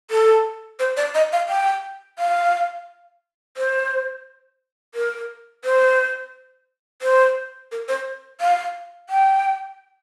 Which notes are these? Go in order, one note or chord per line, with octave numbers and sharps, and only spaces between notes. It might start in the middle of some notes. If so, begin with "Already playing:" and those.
A4
C5
D5
D#5
F5
G5
F5
C5
A#4
C5
C5
A#4
C5
F5
G5